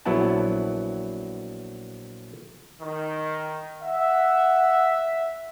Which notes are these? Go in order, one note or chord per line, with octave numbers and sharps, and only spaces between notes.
A#1 F#3 B3 E4 F#5 A5
D#3
E5 F#5